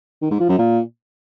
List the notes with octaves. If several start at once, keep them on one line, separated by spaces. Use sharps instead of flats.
D#3
G#2
F3
F#2
A#2